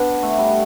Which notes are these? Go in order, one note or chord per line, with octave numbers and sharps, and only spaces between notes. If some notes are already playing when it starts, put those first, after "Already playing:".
Already playing: B3 D4
A3
G3